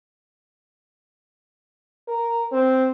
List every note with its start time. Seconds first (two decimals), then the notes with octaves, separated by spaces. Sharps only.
2.08 A#4
2.52 C4